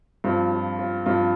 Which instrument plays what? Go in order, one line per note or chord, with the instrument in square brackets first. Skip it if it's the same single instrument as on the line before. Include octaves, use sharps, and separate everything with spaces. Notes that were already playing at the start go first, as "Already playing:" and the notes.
[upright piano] G2 F3 C4 F4
F4
F4
G2 F3 C4 F4